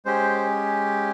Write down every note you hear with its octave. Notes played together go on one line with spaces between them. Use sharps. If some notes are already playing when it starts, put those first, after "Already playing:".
G#3 C#4 G4 C5